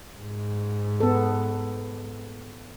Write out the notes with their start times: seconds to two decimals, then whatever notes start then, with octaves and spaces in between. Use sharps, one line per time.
0.19 G#2
1.00 B3 A4